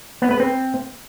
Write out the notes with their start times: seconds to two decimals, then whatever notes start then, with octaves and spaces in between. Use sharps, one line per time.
0.22 B3
0.31 B4
0.40 C4